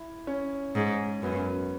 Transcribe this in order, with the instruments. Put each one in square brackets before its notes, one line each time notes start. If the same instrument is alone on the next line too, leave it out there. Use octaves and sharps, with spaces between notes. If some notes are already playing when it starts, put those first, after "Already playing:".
Already playing: [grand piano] E4
C#4
[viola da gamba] G#2
[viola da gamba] F#2 [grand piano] B3